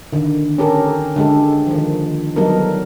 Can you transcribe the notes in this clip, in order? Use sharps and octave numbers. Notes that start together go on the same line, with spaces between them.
D3 D#3
C#4 G4 A4 A#4
D3 G#3 G4 A4
D#3 F3
F#3 G3 B3 D#4 A4 A#4